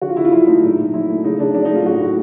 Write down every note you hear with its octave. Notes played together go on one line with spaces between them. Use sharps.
D3 F#4
F4
D3 E4
F4
F#3 E4
A3 D#4
A#2 D#4
A#2
F#3 E4
A3
C#3 D#4
C#3 D4
F#3 D4
A3 D#4
F4
A2 F#4
A2